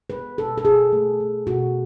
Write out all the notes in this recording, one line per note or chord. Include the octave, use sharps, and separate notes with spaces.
G#3 B4
B2 A4
A4
B2 G#4
A3
A3
B2 F#4